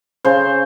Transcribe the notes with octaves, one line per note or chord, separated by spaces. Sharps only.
C#3 C5